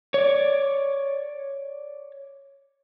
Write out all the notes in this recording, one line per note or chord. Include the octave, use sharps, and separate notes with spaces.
C#5 D5